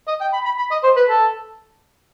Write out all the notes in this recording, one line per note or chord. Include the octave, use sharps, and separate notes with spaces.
D#5
G5
B5
B5
B5
D#5
C5
B4
A4